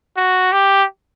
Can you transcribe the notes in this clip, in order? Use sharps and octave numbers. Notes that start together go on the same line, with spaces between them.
F#4
G4